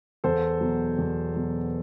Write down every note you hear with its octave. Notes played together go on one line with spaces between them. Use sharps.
E2 A4 C5
B2 F#3
E2
B2 F#3